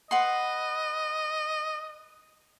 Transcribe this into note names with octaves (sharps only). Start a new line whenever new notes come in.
B4 D#5 F#5 C6